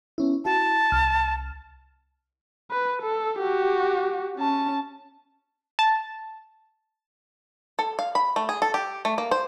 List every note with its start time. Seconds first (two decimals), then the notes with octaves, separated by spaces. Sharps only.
0.18 B3 C#4 E4
0.45 E4 F#4 A5
0.92 C2 F6
2.71 B4
3.02 A4
3.39 F#4 G4
4.37 C#4 A5
5.79 A5
7.79 A4
7.99 F5
8.15 B5
8.36 A3
8.49 G#4
8.62 A4
8.74 G4
9.05 A3
9.18 A#3
9.31 C5